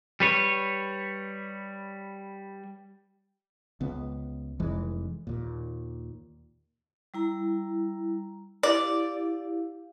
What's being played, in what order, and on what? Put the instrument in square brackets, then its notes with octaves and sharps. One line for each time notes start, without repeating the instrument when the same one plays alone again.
[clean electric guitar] G3 B4 C#5
[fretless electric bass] C#2 B3
F1 E3 G#3
D#2 A#2
[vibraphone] G3 E4 A#5
[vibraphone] E4 G4 F5 [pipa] D5